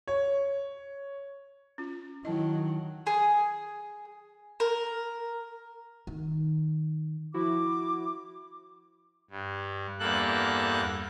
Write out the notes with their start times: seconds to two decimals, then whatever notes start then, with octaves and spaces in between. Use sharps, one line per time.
0.08 C#5
1.78 C#4 F4
2.25 D#3 F#3 E4 D#5 A5
3.07 G#4
4.60 A#4
6.07 D#3
7.34 F3 E4 F#4 D6
9.30 G2
9.99 E2 G2 A#3 A4 F#6